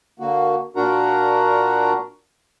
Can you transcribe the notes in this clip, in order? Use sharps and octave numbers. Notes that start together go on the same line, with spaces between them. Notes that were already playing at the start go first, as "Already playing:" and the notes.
D3 A#3 F#4
A#2 D4 F#4 A#4 F#5 A#5